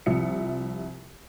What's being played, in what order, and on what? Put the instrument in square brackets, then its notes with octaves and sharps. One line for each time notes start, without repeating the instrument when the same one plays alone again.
[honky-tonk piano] C2 C3 F3 E5 D#6 C#7